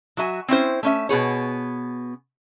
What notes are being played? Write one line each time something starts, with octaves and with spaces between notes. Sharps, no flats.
F#3 F#4 E5 G#5
C4 C#4 E4 C5
A3 C#4 E5
B2 B3 G#4 C#5